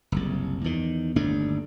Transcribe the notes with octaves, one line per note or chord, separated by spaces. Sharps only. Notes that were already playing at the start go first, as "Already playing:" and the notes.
F#1 C2
E2 D#3
G1 D#2 A3 D4